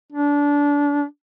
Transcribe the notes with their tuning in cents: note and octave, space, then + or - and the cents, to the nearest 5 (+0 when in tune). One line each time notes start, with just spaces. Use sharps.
D4 -25